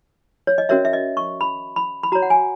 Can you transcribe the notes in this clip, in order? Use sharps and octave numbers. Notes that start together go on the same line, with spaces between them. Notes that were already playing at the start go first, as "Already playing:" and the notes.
C#5
D#5
C#4 F#4 A#4 C#5 E5
E5
D#5
C#6
B5
B5
B5
F#4 C#5 A#5
F#5
G#5